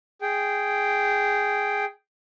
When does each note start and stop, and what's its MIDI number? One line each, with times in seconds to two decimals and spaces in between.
0.22 1.85 68
0.22 1.85 79